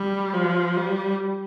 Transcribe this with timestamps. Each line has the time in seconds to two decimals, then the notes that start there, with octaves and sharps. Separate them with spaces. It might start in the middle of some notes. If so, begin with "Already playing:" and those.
Already playing: G3
0.34 F3
0.76 G3